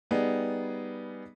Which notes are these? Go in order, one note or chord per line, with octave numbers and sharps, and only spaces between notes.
G3 B3 D#4 G#4